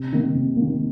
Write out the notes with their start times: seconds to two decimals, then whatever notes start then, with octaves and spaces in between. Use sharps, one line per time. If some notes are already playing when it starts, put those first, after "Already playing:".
Already playing: C3
0.13 D#3 A#3
0.35 C3
0.57 D#3 A#3